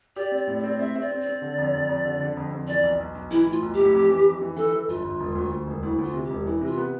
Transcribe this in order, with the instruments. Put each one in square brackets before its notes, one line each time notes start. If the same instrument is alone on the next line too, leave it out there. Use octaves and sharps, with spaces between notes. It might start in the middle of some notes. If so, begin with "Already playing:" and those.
[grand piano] G4 [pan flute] D5
[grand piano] C4
[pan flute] D5
[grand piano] A2
[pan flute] D5
[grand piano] C4
[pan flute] D5
[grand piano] C4 [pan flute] E5
[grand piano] C4
[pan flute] D5
[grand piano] C4
[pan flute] D5
[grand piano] C4
D3
F2
F2
F2
D3
D3
F2
F2
[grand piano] E3 [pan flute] D5
[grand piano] B1
B1
B1
[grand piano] E3 [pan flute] E4
[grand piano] A2
[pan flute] F4
[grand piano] B1
[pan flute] G4
[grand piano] A2
F2
E3
F2
E3
[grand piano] E3 [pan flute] A4
[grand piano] E3
[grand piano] G1 [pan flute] F4
[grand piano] G1
E1
D2
D2
E1
[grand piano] D2 [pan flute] E4
[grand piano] D2
[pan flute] F4
[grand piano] C3
[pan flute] G4
[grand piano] E1
[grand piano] E3 [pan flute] E4
[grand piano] C3 [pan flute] F4
[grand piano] B3